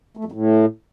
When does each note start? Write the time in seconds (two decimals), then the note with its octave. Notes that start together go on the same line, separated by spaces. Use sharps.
0.17 A3
0.25 F2
0.32 A2